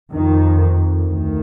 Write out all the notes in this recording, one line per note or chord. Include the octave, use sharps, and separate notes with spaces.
F2 D#3
D2 D#3